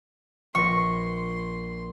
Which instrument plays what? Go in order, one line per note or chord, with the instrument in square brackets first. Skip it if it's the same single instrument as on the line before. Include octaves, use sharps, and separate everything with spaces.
[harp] A#1 B4 A#6 [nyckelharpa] C6 [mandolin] C#6